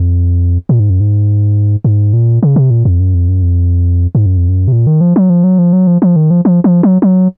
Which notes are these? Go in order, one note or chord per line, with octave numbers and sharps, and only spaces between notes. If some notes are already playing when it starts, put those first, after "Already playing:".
Already playing: F2
A#2
G#2
F#2
G#2
G#2
A#2
C#3
C3
A#2
F2
F#2
F2
F#2
F2
G#2
F#2
F2
F#2
C3
A#2
D#3
F3
F#3
F3
F#3
F3
F#3
F3
F3
D#3
F3
F3
F3
F#3
F#3